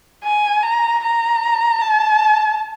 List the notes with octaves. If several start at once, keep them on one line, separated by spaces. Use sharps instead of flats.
G#5
A#5
A#5
A5